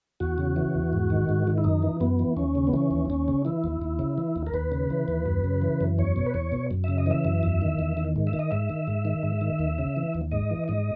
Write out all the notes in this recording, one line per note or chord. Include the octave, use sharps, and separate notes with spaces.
E2 F#4
C#3
E3
E2
G#2
D#3
G#2
D#3
E4
F#2 D#4
E3
F#2 B3
E3
D#2 C#4
C#3
B3
E3 C#4
D#2
D#2 C#4
C#3
E3 E4
D#2
D#2
C#3
E3
D#2
A#4
D#2 B4
C#3
E3
D#2
F#2
C#3
E3
F#2
E2 C#5
B2
B4
E2 C#5
B2
F#2
C#3 E5
D#5
E3 E5
F#2
E2
D#3
E2
D#3
G#2
E5
D#3
D#5
G#2 E5
D#3
G#2
D#3
G#2
D#3
D#2
C#3
E3
D#2
G#2 D#5
E3
G#2 D#5